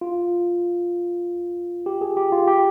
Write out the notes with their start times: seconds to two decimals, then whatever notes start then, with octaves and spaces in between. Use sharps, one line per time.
0.01 F4
1.86 G4
2.01 G#4
2.17 G4
2.32 F4
2.47 G4